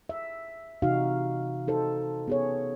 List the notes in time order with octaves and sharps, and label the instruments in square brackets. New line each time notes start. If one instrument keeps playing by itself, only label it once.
[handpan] E5
C3 E3 D#4 F#4 F5
D#4 A4 C5
B3 G#4 C#5